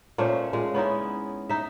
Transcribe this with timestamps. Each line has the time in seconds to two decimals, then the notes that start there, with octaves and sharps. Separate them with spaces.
0.18 A#2 A3 C#4 C5
0.53 A#2 G#3
0.74 B3 C#4 D#4 E4
1.49 D#4 E5